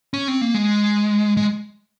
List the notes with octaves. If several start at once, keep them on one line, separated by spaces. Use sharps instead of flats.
C#4
C4
A#3
G#3
G#3